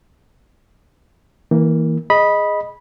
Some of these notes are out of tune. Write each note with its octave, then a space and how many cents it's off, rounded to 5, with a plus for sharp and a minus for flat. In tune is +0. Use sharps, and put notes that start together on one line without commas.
E3 -25 A#3 +0
G#4 +0 D#5 +0 B5 -10